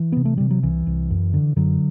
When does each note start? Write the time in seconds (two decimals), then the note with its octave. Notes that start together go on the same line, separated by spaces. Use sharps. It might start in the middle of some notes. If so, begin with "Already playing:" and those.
Already playing: E3
0.12 C3 B3
0.25 A3
0.38 C3 G3
0.51 F#3
0.63 C2 E3
0.87 C2
1.10 F#2
1.34 D3
1.56 F#2 D3 F#3